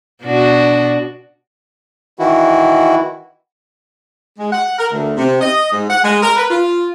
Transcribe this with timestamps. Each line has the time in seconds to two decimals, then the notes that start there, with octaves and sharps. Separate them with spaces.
0.23 B2 D4 F#4
2.19 D#3 E3 E4 F#4
4.38 G#3
4.52 F#5
4.79 A#4
4.91 D2
5.17 C3
5.41 D#5
5.72 G#2
5.90 F#5
6.04 G#3
6.23 A#4
6.37 B4
6.50 F4